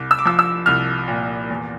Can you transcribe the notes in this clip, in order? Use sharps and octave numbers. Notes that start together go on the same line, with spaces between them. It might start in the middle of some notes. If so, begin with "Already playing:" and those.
Already playing: C2 D6
E6
D6
F3 E6
E6
C2 F6
A#2
E2